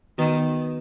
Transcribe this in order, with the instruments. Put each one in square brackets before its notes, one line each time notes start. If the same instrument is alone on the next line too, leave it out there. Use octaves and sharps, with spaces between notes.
[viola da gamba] D#3 [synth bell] B3 F#4 B4